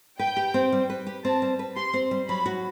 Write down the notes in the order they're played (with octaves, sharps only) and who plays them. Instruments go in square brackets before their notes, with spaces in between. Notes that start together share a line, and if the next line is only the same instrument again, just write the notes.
[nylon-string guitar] B4 [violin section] G5
[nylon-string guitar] G4
C4
G3
B4
G4
[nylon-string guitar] C4 [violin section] A5
[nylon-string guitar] G3
B4
[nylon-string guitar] G4 [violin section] C6
[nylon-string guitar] C4
G3
[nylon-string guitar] F#3 [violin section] B5
[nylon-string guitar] F#4